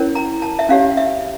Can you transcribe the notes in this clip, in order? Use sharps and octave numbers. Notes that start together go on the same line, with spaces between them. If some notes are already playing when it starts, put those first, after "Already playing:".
Already playing: C#4 E4 A#4 C#5
A#5
A5
E5
C#4 G4 C#5 F5
E5